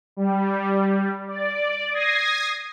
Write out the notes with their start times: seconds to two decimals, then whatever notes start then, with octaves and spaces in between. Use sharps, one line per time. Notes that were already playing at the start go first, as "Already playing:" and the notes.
0.17 G3
1.28 D5
1.92 D#6 G#6 A#6 C7